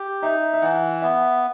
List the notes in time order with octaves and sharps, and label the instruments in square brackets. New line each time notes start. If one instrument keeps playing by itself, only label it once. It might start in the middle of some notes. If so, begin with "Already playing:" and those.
Already playing: [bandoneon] G4
[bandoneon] D#4 [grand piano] E5
[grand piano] E5
[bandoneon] E3 [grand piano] F#5
[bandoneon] B3 [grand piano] E5